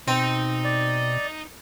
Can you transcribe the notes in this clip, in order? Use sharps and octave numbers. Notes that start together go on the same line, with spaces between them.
B2 C4 D#4
D5